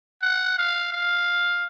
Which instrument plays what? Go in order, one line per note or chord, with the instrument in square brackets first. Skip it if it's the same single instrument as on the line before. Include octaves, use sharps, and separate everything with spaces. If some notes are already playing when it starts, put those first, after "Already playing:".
[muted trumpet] F#5
F5
F5